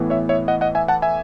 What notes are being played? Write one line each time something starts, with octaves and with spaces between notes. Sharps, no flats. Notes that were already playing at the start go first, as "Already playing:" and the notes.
Already playing: A2 E3 B3
C#5 E5
C#5 E5
D#5 F#5
D#5 F#5
E5 G#5
F#5 A5
E5 G#5